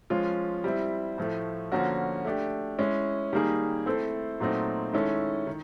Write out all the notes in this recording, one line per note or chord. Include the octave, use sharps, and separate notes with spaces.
F3 G#3 C#4 F4
G3 C4 E4
A2 F3 A3
D3 F3 A#3 C#4 F#4
A3 D4 G4
G#3 C#4 E4
D#3 G3 A#3 D#4 G#4
A3 C4 E4 A4 C5
A#2 F#3 A3 C4 D#4
D#3 G#3 C#4 E4 A4
D#3